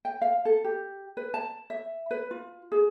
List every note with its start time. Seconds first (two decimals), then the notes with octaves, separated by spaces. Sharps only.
0.05 G5
0.22 F5
0.45 A4
0.64 G4
1.17 B4
1.34 A5
1.70 E5
2.11 B4
2.31 F4
2.72 G#4